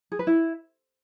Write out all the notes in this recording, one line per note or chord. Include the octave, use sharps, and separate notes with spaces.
G#4
B4
E4